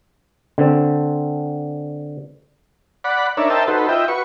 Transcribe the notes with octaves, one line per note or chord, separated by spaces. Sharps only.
D3 C4
D5 F#5 B5
D4 D#4 A#4 C#5 D5 E5
A#4 C5 D#5 E5 G5 A5
D#4 F#4 A4 B4 C5
F4 D#5 E5 G5
F#4 B4 C#6